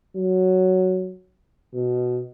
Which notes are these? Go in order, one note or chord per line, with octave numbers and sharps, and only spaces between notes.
F#3
B2